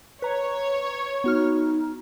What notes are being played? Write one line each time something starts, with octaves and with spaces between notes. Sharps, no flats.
B4 C#5 A#5
B3 D#4 F#4 F6